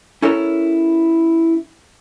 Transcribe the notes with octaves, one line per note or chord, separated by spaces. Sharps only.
C#4 E4 A4 A#4 C#5